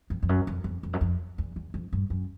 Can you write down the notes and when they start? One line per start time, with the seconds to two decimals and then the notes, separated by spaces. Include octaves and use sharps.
0.10 F2
0.22 F2
0.29 F#2
0.47 F2
0.64 F2
0.83 F2
0.93 F#2
1.01 F2
1.38 E2
1.56 E2
1.74 F2
1.93 G2
2.10 F#2